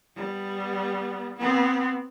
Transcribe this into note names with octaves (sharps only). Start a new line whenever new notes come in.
G3 B3
B3 C4